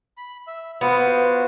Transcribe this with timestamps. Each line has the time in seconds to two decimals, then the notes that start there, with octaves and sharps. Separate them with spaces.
0.17 B5
0.47 E5
0.81 B3 F4 F#4 C5